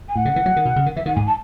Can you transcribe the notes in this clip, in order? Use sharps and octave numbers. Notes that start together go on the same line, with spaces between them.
G#5
A2 F#5
C#3
E3
F#3
D#3
B2
C#3
D#3
E3 E5
D#3 F#5
G#2 G#5
A5